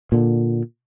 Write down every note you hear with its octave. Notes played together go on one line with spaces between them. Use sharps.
A#2 D3